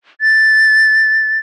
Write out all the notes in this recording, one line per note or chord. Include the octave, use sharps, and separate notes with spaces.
A6